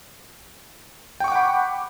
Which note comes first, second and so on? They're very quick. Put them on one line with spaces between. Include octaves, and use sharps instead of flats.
G5 C#6 D6 F#5 B5